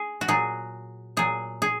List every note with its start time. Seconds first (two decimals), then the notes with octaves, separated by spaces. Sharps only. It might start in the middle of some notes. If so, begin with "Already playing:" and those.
Already playing: G#4
0.21 F#4
0.28 A#2 F#3 G#4
1.17 A#2 F#3 G#4
1.62 G#4